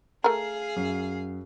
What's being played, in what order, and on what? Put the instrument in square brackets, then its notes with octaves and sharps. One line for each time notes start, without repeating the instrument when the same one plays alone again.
[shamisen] A3 A#4 [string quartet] G#4 F5
[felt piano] F#2